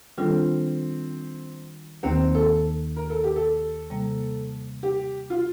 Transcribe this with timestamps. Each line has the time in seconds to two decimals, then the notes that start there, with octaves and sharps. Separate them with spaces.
0.17 D#3 G3 C4 D4 F4 A4
2.03 D#2 D#3 A#3 C4
2.35 A4
2.96 A#4
3.10 A4
3.24 G4
3.36 A4
3.90 C3 G3 A#3
4.83 G4
5.30 F4